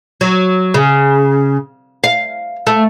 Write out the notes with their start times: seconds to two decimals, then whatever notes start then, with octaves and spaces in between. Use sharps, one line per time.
0.21 F#3
0.74 C#3
2.04 F5
2.67 A3